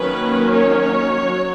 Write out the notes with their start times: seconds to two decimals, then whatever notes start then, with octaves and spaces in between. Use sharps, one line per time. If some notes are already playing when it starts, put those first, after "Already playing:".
Already playing: D#3 F#3 A#3 C#4 B4
0.53 C#5
1.24 F#3